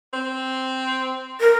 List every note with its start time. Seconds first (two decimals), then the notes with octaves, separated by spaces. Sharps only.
0.13 C4
1.40 A#4